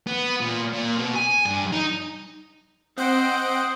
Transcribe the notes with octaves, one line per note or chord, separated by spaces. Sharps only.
B3
A#2
A#2
B2
G#5
G2
D#4
C4 C5 D#5 F#5 D7